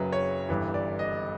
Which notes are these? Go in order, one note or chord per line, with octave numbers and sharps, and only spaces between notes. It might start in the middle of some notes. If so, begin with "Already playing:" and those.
Already playing: F#1 F#2 C#3 F#3 B4
C#5
G1 G2 E3
D5
D#5